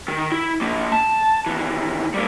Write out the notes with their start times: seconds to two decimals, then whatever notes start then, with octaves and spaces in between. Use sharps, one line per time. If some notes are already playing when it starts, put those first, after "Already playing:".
0.08 D#3
0.32 E4
0.61 F3 A#3
0.92 A5
1.46 D#2 E3
2.14 G3 A#3